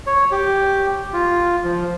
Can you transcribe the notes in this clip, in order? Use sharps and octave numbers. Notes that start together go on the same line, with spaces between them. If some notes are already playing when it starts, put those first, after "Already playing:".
C#5
G4
F4
F3